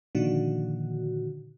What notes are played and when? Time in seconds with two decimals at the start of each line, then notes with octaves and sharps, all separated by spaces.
0.15 A#2 D3 D#3 F3 F#4